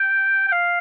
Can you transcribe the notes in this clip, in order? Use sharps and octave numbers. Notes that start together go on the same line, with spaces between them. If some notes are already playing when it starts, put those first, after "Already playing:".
Already playing: G5
G5
F5